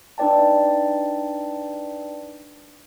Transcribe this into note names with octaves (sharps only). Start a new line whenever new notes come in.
D4 D#4 B4 D5 G5 A5